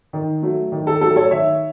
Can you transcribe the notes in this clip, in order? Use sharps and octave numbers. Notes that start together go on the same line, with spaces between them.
D#3
F#3 A3
D#3
A4
F#3 A3 A4
A4 C#5
D#3 C#5 E5